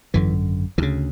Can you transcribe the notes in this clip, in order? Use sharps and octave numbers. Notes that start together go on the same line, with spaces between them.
G#1 F#2 D3 E3
D2 C#3 E3